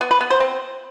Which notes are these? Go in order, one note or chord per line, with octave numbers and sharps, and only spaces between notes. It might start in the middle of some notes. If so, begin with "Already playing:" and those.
B3
B4
B3
C5
C4